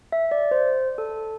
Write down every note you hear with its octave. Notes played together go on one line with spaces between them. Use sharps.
E5
D5
C5
A4